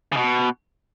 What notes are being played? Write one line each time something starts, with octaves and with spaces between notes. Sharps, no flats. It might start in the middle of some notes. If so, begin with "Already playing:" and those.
C#3
B2